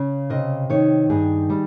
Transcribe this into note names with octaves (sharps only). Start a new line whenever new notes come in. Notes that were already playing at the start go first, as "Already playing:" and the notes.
Already playing: C#3
C3 D#5
D#3 C#5
G2 G#4
G3